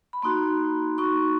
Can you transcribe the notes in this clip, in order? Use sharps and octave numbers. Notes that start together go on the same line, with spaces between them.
B5
A#3 D#4 F#4 C6
A#3 D#4 F#4 C#6